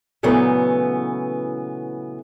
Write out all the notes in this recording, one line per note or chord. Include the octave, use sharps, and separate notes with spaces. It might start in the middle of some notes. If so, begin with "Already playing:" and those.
A#2 C#3 E3 F#3 A3 B3